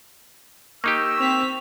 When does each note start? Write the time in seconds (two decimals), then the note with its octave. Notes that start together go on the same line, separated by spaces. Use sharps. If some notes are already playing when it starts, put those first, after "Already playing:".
0.84 A#3 D#4 G4 C#6 E6
1.18 C4 C#6 B6 F7